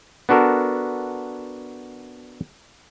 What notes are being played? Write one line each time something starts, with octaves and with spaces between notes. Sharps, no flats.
B3 D4 F#4 A4 A#4